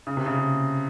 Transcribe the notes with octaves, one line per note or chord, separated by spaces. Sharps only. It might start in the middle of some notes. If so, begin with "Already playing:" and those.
C#3
C3
C#3
C#3